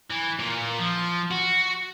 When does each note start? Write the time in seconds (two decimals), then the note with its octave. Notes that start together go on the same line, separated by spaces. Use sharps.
0.11 E3
0.40 A#2
0.78 F3
1.31 F#4